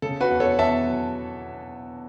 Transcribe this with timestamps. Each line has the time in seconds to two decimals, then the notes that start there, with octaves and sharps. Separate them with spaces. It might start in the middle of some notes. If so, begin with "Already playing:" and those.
0.02 C#3 A4
0.21 F#4 B4
0.30 E2
0.40 A4 C#5
0.58 E2 E5 A5
0.86 F#3